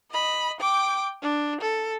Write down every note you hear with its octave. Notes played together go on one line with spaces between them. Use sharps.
D#5 B5
G5 D6
D4
A4